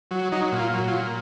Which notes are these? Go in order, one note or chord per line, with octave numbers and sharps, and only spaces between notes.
F#3
F#3 D#4
A#2
F4
F#3
F4
A#2